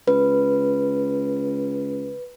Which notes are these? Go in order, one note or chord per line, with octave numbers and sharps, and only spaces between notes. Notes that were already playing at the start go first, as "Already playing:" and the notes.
C#2 B4